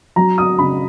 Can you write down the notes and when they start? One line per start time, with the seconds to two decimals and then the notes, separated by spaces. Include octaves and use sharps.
0.16 F#3 A#5
0.38 D#6
0.59 C#3 B5